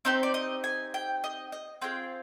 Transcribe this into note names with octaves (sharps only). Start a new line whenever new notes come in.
C4 D#4 G4 C5
D5
D#5
G#5
G5
D#5
D#5
C4 F4 G#4 G5